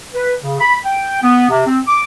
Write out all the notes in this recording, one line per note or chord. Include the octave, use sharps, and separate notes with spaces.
B4
C#3
B5
G5
B3
C3
C4
D6